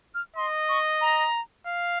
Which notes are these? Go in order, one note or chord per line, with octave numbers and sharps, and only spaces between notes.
F6
D#5 C6
C#6
A#5
F5